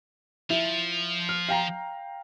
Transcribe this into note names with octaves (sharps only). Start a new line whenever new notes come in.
F3 E4
F6
F5 G5 A#5